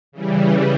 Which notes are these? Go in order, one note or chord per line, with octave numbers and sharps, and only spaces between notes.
C#3 E3 G3